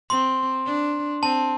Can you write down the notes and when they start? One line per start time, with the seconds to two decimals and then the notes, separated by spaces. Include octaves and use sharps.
0.10 C4 C6
0.66 D4
1.22 C4 A5